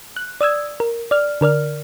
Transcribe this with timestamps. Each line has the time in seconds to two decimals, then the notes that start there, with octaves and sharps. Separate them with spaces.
0.17 F#6
0.41 D5 D#6 E6 G#6
0.80 A#4
1.11 D5 F6
1.41 D3 A#4 D5 F6